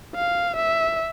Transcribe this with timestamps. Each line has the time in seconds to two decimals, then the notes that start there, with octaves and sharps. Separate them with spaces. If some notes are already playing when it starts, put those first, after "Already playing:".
0.15 F5
0.56 E5